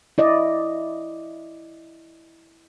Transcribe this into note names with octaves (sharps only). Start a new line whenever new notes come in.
E4 D5 D#5